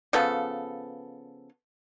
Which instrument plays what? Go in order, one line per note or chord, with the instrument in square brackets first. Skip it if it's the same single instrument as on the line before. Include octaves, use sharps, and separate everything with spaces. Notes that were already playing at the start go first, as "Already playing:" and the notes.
[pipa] C#3 F3 B3 A4